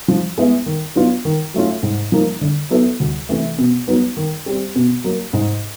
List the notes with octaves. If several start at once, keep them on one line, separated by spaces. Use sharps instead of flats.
F3
G#3 B3 E4
D#3
F#3 B3 D4 F4
D#3
F#3 A3 C#4 F4
G#2
F3 A#3 D#4
D3
F#3 B3 E4 A4
D2
C3 E3 A3
B2
F#3 B3 D#4
D#3
G3 C4
B2
F#3 A#3
G#2